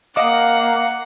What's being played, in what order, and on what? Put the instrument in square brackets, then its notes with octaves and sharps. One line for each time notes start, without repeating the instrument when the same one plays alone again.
[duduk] A#3 [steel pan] D#5 D6 [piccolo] F5 [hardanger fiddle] F#5